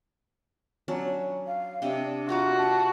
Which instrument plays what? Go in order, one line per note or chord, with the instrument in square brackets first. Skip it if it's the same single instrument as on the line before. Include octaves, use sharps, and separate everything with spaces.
[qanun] F#3 C#4 D4
[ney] F5
[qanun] C3 D#5 G5 [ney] D4
[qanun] F4 A#5 D6 [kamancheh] F#4
[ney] A5